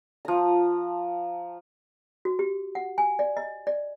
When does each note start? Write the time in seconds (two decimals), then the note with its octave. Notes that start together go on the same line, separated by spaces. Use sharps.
0.25 F3 A#5
2.25 F#4
2.39 G4
2.75 F#5
2.98 G#5
3.19 D5
3.37 D#5
3.67 D5